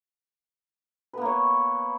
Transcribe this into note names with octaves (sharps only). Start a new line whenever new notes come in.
A#3 B3 B4 C#5